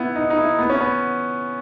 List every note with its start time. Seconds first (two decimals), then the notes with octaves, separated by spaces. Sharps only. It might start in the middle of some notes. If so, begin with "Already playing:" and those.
Already playing: B3 E4
0.16 D#4
0.30 D#4
0.38 E4
0.59 B3
0.70 C#4
0.81 B3